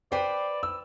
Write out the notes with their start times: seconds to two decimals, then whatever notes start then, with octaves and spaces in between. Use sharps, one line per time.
0.12 B4 C5 D5 G5
0.63 E6